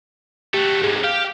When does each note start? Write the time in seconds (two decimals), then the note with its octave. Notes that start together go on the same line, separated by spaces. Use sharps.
0.54 F#3 A3 G4
0.83 G#2 C3 G#4
1.04 G4 F5